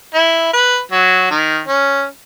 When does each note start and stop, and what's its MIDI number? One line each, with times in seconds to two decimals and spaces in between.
0.14 0.52 64
0.54 0.79 71
0.92 1.30 54
1.30 1.60 51
1.68 2.05 61